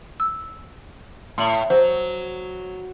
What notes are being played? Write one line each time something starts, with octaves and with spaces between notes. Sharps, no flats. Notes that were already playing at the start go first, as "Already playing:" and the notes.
E6
A2 C6 F#7
F#3 C5